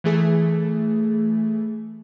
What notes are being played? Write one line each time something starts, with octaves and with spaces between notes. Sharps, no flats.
E3 A3 G#4